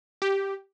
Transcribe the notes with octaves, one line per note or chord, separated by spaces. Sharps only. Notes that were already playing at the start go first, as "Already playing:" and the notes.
G4